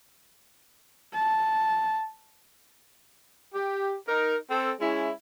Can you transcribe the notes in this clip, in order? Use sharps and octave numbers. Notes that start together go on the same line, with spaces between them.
A5
G4
D#4 A#4
C4 A4
G#3 C#4 E4